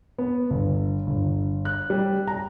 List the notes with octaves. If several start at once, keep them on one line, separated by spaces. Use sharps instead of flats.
B3
G1
G1
F#6
G3
A#5